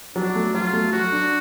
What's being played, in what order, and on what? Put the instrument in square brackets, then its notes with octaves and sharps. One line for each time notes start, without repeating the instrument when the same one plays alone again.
[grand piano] F#3 [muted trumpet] D4
[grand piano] A3
[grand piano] F#3 [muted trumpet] F4
[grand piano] A3
[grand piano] F#3 [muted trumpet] F#4
[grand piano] D4